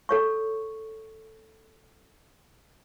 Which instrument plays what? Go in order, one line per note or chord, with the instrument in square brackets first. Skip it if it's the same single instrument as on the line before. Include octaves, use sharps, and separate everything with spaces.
[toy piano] A4 C#5 C#6